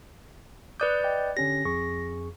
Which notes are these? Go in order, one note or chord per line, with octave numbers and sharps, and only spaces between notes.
B4 D5 D6 D#6 F#6 G6
D#5 G5
D3 C#4 G4 A#6
F2 G#4 C#6